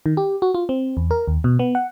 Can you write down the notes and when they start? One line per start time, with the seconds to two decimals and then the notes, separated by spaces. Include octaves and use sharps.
0.06 D#3
0.17 G4
0.42 F#4
0.54 F4
0.69 C4
0.97 E2
1.11 A#4
1.28 D#2
1.44 B2
1.59 B3
1.75 F#5